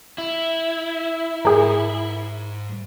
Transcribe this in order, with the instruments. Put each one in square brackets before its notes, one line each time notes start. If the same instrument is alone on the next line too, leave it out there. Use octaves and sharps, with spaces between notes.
[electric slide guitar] E4
[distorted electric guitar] G#2 [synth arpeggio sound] G#4 A#4